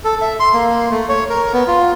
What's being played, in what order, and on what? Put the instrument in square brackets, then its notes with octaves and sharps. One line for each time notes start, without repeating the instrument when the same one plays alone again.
[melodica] A4
E5
C6
A#3
A3
C#5
A#4
B3
F4